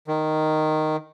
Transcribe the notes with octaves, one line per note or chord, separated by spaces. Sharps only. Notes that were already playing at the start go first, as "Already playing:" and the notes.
D#3